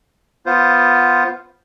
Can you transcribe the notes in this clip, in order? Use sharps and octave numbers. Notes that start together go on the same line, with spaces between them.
B3 F4 C5